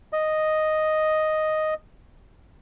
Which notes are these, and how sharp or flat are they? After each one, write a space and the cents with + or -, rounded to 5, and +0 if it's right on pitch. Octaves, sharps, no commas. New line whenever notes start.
D#5 +0